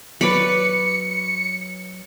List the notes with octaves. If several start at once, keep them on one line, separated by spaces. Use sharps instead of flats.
F#3 B4 D5 B5 C#7